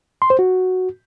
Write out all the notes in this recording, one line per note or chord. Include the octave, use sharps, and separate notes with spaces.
C6
C5
F#4